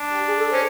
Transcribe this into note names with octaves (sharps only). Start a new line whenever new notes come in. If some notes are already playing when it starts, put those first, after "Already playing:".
Already playing: D4
G4
G#4
A4
C5
C#4